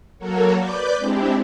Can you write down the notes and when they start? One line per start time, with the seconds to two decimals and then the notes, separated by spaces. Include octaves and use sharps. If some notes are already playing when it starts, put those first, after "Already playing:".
0.19 F#3 A#3 F#4 A4 A#4 C#5
0.58 B4 D5 D6 G6
0.97 G#3 C4 D4 E4 G4